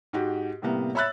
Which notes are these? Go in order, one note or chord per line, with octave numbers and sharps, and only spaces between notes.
G#2 F#4 G4
A2 C3 G3 A#3 B3
C#5 E5 B5 E6 F#6 A6